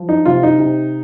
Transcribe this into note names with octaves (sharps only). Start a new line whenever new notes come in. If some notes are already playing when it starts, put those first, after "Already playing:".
Already playing: F3
D#4
C3 F4
D#4
C3